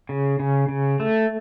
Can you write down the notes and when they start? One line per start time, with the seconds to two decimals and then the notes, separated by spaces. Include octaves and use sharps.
0.09 C#3
0.40 C#3
0.69 C#3
1.00 A3